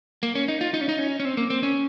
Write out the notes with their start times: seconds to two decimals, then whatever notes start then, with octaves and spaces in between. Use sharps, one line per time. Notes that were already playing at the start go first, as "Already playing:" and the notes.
0.23 A#3
0.35 C#4
0.48 D#4
0.61 F4
0.74 D#4
0.81 C#4
0.89 D#4
0.99 C#4
1.20 C#4
1.25 C4
1.37 A#3
1.50 C4
1.63 C#4